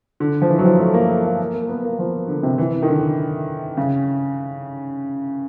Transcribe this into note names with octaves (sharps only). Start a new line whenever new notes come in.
D3
F3
E3
F#3
F3
A3
A#3
A3
A#3
A#3
A#3
B3
A#3
F3
D3
C3
E3
D#3
D3
C#3